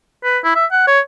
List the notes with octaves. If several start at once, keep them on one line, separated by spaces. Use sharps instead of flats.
B4
E4
E5
F#5
C#5